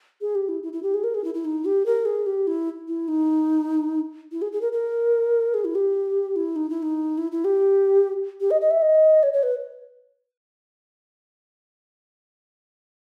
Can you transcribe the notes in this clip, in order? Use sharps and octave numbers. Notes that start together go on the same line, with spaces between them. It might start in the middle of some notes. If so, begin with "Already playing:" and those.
G#4
G4
E4
E4
E4
G4
G#4
A#4
G#4
E4
E4
D#4
G4
A#4
G#4
G4
E4
E4
D#4
E4
G#4
G#4
A#4
A#4
G#4
E4
G4
E4
D#4
E4
D#4
E4
E4
G4
G4
D#5
D#5
E5
D#5
C#5
C#5
B4